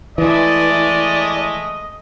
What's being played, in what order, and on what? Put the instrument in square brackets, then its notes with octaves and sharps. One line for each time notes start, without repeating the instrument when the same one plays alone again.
[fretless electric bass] E3 [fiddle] G#3 A3 [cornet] D5 [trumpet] D#5